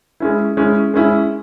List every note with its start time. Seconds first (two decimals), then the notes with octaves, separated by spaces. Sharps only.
0.20 G#3 C#4 E4
0.57 G#3 C#4 E4
0.94 G#3 C#4 E4